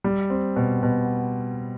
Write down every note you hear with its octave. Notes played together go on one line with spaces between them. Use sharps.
G3
C4
B2
B2